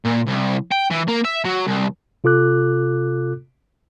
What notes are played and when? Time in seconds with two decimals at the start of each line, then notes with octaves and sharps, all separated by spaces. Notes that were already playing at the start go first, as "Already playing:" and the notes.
0.06 A#2
0.27 C2
0.72 G5
0.91 E3
1.08 A#3
1.25 E5
1.45 F#3
1.67 C2
2.24 C3 F4 A4 D6 F#6